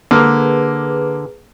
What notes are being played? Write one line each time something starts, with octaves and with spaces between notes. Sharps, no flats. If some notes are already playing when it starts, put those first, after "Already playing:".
D3 A#3 G#4 B4